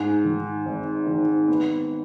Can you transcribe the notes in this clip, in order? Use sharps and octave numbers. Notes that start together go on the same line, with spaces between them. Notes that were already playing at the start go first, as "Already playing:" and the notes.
Already playing: G#2
D#3
G#1
D#3
B3